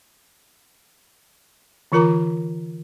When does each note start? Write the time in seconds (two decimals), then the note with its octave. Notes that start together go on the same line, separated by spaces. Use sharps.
1.92 D3 E3 F4 A#4 A#5 D6